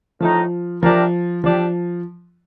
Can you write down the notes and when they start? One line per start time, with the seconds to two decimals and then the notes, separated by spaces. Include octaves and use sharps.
0.20 A2 F3 A3 D#4
0.83 C3 F3 G3 D4 G4 A#4
1.44 F3 G3 D4 G4